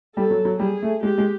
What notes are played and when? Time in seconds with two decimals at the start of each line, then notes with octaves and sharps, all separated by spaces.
0.16 G3 A4
0.31 F#3
0.45 F#3
0.60 G3 G#4
0.82 A3
1.03 G#3 G4
1.18 G#3